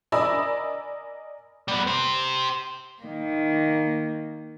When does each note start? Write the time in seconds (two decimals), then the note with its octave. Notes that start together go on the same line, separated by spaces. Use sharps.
0.12 A#4 D5 D#5 G#5 B5 E6
1.68 G3 B3
1.87 G4 C5
3.03 D#3 A#3